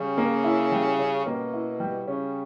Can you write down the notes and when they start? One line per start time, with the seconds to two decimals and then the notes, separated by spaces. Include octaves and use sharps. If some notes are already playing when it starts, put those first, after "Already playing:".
Already playing: C#3 G3 C#4
0.18 A#3
0.44 E4
0.72 G3
0.99 C#4
1.26 B2 A#3
1.53 E4
1.80 G3
2.07 C#3 C#4